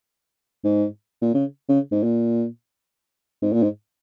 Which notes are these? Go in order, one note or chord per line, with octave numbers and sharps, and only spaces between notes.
G#2
A#2
C#3
C#3
G#2
A#2
G#2
A#2
G#2